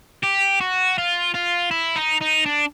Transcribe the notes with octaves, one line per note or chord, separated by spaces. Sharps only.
G4
F#4
F4
F4
E4
D#4
D#4
D4